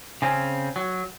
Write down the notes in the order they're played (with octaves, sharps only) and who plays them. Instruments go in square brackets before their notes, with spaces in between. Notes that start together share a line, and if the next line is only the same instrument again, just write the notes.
[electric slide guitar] C#3 C4 C#4
F#3